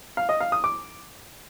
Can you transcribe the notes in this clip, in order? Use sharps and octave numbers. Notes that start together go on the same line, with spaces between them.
F5
D#5
F5
D#6
D6